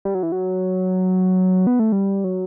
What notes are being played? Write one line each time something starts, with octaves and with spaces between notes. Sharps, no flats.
G3
F#3
E3
F#3
B3
A3
G3
F#3